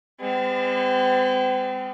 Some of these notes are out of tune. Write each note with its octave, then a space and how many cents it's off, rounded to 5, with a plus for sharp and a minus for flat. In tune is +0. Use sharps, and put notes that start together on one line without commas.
G#3 -45 C4 -40